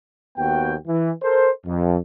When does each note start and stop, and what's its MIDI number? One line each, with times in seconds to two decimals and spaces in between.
0.37 0.76 39
0.37 0.76 59
0.37 0.76 66
0.37 0.76 79
0.87 1.12 52
1.23 1.50 69
1.23 1.50 70
1.23 1.50 72
1.66 1.97 41